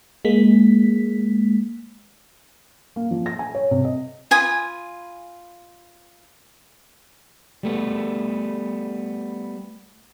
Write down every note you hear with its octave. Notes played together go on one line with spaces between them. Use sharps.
G#3 A#3 B6
A#3
F3
A#6
G#5
C#5
C3
D#5
F4 G#5 B5 D#6
G3 A3 B3